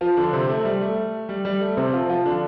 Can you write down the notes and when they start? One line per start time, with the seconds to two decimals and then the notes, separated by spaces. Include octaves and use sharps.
0.01 F3 F4
0.17 D3 D4
0.33 C3 C4
0.49 A3
0.65 G3
0.81 A3
1.29 G3
1.45 G3
1.61 A3
1.77 C3 C4
1.93 F3 F4
2.09 F3 F4
2.25 D3 D4